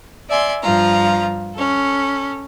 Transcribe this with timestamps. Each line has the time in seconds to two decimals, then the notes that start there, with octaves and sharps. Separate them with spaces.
0.28 D5 E5 G#5 C6
0.62 G2 F3 F4 A#5
1.55 C#4 A4